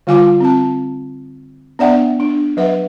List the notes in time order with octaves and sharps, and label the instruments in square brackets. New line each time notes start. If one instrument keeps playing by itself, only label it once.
[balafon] D3 G3 F4 F5 G#5 D6
C4 A5
B3 D4 D5 E5 F#5 G5
D4
F#3 B4 E5 F#5